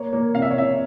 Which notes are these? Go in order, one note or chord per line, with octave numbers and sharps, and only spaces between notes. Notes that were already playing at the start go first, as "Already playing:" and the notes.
Already playing: A#3 C#5
A#3
C3 F5
E5
C#5
C3 E5